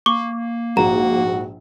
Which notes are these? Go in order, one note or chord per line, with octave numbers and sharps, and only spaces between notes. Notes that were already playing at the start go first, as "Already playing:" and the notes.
A#3 C#6 D6
A#1 G#2 F#4 F#5 A#5